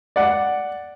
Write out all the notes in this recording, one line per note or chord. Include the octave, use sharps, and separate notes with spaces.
D5 F#5